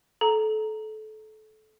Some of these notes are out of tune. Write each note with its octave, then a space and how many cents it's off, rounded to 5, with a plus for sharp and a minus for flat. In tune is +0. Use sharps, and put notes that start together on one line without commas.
A4 -25 A#5 -5